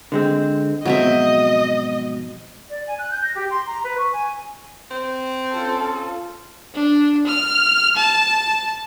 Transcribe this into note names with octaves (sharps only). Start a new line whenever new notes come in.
D3 G#3 C4
F2 G#2 B2 F#3 C4 D#5 E5
D5
G#5
F#6
G6
A#6
G4
C6
A#5
B4
C#6
G#5
C4
C#4 F4 A4
D4
F6
A5